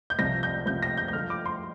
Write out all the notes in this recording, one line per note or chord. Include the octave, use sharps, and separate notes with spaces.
G6
C2 C3 F3 A#6
G6
C2 C3 F3 G6
A#6
G6
G6
G2 D3 F3 F6
D6
C6